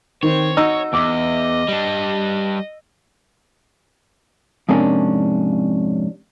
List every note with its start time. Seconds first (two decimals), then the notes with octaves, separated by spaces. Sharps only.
0.23 D#3 C4 C#5
0.57 D#4 F#4 E6
0.93 E2 D#5 D6
1.68 G3 D4
4.69 F2 G#2 C3 A#3 C#4 D4